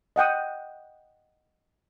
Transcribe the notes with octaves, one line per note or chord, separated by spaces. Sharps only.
D#5 F#5 G5 D#6